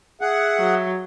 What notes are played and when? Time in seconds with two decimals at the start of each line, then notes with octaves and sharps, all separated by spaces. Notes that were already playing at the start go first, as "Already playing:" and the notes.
0.21 G#4 E5 F#5
0.59 F#3